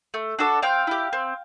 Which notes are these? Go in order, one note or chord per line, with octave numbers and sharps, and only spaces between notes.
A3
D4 F#4 A4
C4 F5 G5
E4 G4
C4